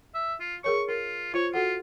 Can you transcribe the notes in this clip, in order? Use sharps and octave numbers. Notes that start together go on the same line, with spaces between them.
E5
F4
G#4 A#4 C#5 C#6
F4 A#4
F4 C5 C#5
F4 F#4 A4 F#5